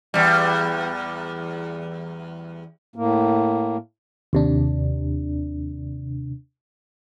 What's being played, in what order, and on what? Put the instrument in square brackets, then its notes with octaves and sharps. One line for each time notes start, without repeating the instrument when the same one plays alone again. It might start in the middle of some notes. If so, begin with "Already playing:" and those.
[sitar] E2 G3
[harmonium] A2 A#3
[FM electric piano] D#2 C3 D4